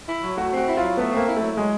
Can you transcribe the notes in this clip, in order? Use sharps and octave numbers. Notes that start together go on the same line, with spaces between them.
E4
F#3
A3 F#4
C4 F#4
E4
F4
F#3
A3 B3
A#3 C4
E4
F#3 A3
F#3 G#3